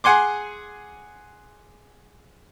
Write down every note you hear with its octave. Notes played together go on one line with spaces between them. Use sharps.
G#4 F#5 G#5 C6 D6